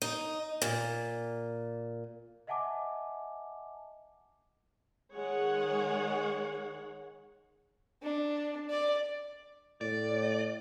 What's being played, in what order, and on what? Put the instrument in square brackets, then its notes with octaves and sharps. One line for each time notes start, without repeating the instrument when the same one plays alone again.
[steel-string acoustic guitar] D#4
A#2
[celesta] D#5 E5 F#5 G#5 A5 D6
[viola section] D#3 G#3 G#4 C#5 F#5
[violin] D4
D5
[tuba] A2 [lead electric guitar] D5